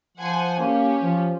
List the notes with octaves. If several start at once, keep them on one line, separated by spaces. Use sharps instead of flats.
F3 C5 F#5 G#5
A#3 C#4 G4
F3 F4